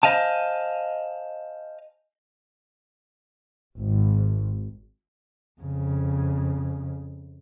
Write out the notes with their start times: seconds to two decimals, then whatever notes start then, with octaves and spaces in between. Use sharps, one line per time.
0.03 C5 D#5 F5 G#5 A5
3.78 G#1
5.61 F2 C#3